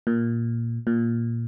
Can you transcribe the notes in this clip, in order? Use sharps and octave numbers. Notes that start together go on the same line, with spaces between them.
A#2
A#2